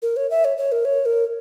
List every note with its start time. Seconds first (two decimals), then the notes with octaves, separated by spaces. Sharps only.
0.02 A#4
0.17 C#5
0.31 E5
0.45 C#5
0.58 C#5
0.72 A#4
0.85 C#5
1.06 A#4